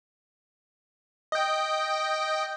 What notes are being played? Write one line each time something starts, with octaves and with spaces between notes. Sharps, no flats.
D#5 G5